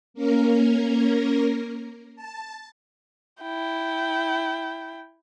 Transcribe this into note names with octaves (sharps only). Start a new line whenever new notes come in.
A#3 C#4 A#4
A5
E4 G5